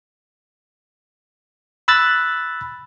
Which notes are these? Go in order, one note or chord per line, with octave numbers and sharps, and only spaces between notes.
B5 E6 F#6 A6